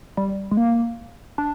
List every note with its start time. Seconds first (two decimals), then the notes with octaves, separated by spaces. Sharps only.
0.17 G3
0.51 G#3
0.57 A#3
1.38 D4